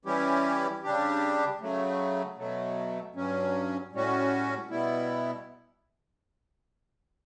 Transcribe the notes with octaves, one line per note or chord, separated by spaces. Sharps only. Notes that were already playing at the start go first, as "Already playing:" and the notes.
E3 G3 C#4 E4 G4
C#3 G3 D4 G4
C#3 F#3 A3
B2 F#3 A3
G2 F#3 C#4
A2 G3 C#4 F#4
B2 G3 B3 E4